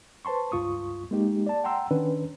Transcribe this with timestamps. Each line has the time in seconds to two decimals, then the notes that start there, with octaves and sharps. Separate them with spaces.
0.25 B4 C5 A5 C6 C#6
0.52 C#2 G2 F4 C#6 D#6
1.11 G#3 A#3 D#4 G4
1.47 D5 A5
1.64 F#5 G5 A#5 C6 E6
1.91 D#3 C#4 D4 B4